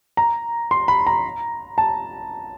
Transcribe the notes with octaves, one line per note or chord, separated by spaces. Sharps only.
A#5
C6
B5
A#5
A5